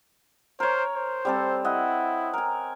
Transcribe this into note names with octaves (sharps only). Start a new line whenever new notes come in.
A#4 C5 C#5
C5
G3 C4 A4
E4 D#5 F#5
A#4 G#5